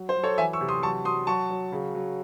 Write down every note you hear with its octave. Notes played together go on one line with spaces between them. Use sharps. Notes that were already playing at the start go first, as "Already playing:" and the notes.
Already playing: F#3
C5
F#3
A4 C#5
E3 E5 G#5
C#6 E6
C3
C6 D#6
F#3 A5 C#6
F#3 C6 D#6
F#3 A5 C#6
F#3
C#3
F#3